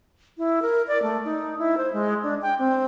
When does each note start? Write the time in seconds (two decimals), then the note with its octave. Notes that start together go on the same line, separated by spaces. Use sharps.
0.38 E4
0.62 A#4
0.88 D5
1.02 A3
1.25 D#4
1.59 E4
1.77 C5
1.93 G#3
2.23 D4
2.42 G5
2.59 C4